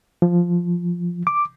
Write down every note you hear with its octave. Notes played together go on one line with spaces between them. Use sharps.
F3
D6